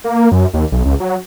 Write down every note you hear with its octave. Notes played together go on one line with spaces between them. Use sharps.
A#3
F#2
D#2
B1
C#2
F#3